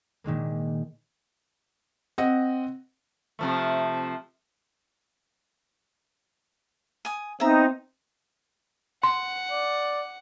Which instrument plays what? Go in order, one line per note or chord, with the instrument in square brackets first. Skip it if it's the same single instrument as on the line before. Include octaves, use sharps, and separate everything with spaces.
[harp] A#2 D#3 G#3 A#3
[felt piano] C4 D#5 F#5
[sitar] C3 F3 A3
[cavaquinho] G#5 D#6
[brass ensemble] B3 C4 [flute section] D#4 [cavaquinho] E5 A#5
[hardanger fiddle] F#5 [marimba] C6
[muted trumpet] D5